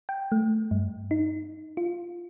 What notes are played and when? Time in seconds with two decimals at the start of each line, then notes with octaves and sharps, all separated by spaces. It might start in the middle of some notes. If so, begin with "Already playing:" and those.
0.09 G5
0.32 A3
0.71 G2
1.11 D#4
1.77 F4